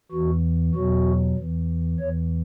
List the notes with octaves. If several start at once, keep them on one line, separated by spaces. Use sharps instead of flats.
E2 E3 F#4
E2 B2 F#3 F#4
E2 E3
E2 E3 C#5